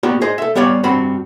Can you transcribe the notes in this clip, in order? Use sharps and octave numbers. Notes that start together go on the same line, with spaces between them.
A#3 B3 F#4 G4 D5
G#4 C5 D#5
A4 E5
G3 B3 G4 C#5 D5 F5
G2 C4 F#4 B5